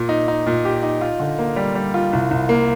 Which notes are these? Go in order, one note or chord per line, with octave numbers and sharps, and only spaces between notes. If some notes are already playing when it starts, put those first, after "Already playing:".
Already playing: A#2
D#4
D#4
A#2
G4
D#4
F4
D3
A#3
G3
G3
F4
C2
C2
A#3